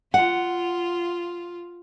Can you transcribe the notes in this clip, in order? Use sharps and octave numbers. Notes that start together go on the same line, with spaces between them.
F4 F#5